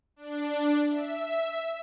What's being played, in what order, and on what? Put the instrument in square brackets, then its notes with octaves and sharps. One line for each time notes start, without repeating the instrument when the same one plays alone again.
[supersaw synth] D4
E5